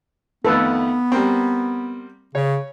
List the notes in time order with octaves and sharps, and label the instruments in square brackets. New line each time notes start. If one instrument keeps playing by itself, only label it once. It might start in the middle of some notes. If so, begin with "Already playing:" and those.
[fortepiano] F2 D#3 A3 [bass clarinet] B3 [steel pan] A4 B4
[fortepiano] G3 A#3 C4
[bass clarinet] C#3 [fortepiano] C#5